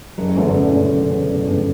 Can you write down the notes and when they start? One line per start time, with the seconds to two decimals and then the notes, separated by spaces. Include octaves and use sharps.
0.18 F#1 F#3
0.36 E2 G2 D3 A3 C#4
0.54 F#1 B2
0.73 E2 D3 A3 C#4
0.92 F#1
1.10 E2 D3 A3 C#4
1.28 F#1
1.47 E2 G2 D3 A3 C#4